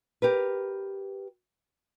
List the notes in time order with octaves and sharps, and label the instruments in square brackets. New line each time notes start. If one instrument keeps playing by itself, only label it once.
[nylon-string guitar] G4 A#4 B4